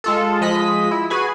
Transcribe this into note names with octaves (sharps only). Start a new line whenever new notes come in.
G#3 F4 A4
F3 G#3 D#5 B5 B6
E4
F#4 G#4 B4 G#5